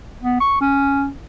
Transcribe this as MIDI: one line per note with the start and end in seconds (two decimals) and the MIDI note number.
0.23 0.40 59
0.40 0.56 85
0.61 1.07 61